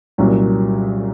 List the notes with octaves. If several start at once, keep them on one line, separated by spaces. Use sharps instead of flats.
C2 A#2 F#3 C#4